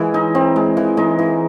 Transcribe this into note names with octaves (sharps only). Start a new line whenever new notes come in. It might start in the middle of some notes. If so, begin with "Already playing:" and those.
Already playing: E3 G#3 E4
D#4
C4
G#3
E3
G#3 D#4
E3